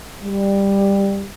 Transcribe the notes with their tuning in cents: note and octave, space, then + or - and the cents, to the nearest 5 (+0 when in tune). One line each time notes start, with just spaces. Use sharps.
G3 +15